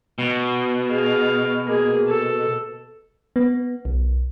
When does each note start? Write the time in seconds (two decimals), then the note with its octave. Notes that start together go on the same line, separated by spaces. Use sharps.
0.19 B2
0.89 G#4 F5
1.67 A#3 G#4
2.07 A4
3.36 B3
3.85 B1